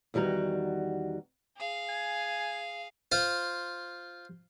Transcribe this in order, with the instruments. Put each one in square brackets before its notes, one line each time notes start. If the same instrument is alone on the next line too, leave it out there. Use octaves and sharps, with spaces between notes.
[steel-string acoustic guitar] E2 D#3 G3 F#4 A#5
[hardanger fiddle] G#4 F5
[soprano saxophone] G#5
[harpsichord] F4 C5